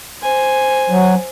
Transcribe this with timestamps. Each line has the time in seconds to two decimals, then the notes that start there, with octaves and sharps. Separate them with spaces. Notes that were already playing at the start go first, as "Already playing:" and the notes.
0.22 C5 G#5
0.90 F#3